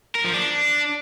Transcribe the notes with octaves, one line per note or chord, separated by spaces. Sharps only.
A#4
F3
D4